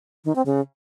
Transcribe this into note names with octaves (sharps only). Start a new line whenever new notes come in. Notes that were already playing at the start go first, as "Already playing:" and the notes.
D#3
C4
C#3